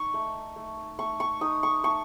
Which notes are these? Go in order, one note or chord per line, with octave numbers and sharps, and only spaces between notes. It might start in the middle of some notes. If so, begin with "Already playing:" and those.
Already playing: D#4 C#6
A3
A3
A3 C#6
C#6
D#4 D#6
C#6
A3 C#6